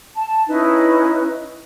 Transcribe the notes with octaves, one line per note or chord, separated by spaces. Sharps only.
A5
C#4 D#4 E4 B4